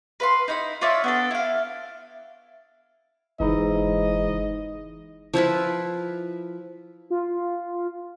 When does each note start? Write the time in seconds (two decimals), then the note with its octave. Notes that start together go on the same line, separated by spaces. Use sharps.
0.20 B4 F5 C6
0.48 D#4 E4 B5
0.81 F4 C#5 D5 E5
1.04 B3 D4 A4
1.31 E4 F5
3.40 F#1 G#2 E3 D#4 E4 D#5
5.34 F3 E4 F4 B4
7.10 F4